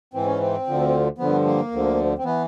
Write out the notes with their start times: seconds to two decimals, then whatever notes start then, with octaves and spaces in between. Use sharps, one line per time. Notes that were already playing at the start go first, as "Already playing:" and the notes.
0.14 G#2 E3 C4
0.26 C#4
0.40 C4
0.66 D2 D3 F3
1.18 G2 D3 F3 B3
1.45 A#3
1.71 D2 D3 F3
2.18 C4
2.24 E3 B3